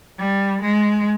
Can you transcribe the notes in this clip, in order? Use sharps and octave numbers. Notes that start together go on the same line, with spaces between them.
G3
G#3